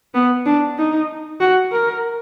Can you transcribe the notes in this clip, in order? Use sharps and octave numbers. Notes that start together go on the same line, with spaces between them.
B3
D4
D#4
F#4
A#4